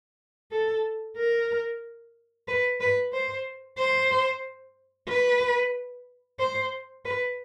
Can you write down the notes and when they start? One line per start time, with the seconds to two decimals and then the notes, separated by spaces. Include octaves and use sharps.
0.52 A4
1.16 A#4
2.48 B4
2.81 B4
3.13 C5
3.78 C5
5.08 B4
6.39 C5
7.05 B4